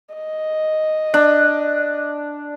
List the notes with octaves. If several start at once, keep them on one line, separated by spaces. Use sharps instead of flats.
D#5
D4